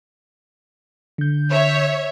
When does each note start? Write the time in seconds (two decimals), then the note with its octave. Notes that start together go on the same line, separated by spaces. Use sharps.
1.18 D3 G6
1.52 C#5 E5